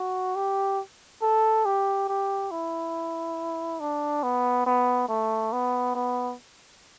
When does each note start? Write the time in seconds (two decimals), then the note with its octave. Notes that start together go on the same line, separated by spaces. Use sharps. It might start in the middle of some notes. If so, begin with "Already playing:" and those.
Already playing: F#4
0.35 G4
1.22 A4
1.65 G4
2.08 G4
2.51 E4
3.80 D4
4.23 B3
4.67 B3
5.09 A3
5.53 B3
5.95 B3